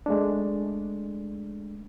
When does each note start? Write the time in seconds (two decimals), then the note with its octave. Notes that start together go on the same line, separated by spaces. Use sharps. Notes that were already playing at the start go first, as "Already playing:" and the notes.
0.06 G#3 A3 D4